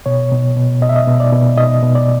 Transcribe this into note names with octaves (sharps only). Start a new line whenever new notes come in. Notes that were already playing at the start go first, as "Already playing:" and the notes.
B2 C#5
B2
B2
B2 D#5
E5
D#5
B2
D5
B2
B2 D#5
B2
D5